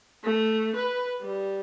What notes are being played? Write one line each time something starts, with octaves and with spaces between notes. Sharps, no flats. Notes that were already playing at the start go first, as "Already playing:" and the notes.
A3
B4
G3